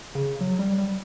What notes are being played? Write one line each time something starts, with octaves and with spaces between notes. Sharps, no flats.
C#3
F#3
G3
G3